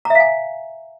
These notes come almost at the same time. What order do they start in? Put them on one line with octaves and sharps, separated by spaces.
A#5 E5 F5 G#5